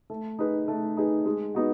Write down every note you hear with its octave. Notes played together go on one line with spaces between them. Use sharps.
A3
D#4 G#4 B4
A3
D#4 G#4 B4
G#3
B3 D#4 F#4